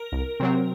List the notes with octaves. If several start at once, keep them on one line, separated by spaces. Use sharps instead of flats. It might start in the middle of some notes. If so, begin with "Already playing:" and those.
Already playing: A#4
C2
C3 F#3 C4